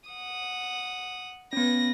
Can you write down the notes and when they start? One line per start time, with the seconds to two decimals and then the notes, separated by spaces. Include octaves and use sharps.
0.10 F#5 D#6
1.53 B3 C#4 B4 A#6